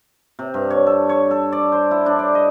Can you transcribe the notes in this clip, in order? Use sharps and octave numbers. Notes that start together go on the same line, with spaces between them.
C3
G2
C#5
A4
C#5
A4
D5
C5
E4
D4
D5
D#5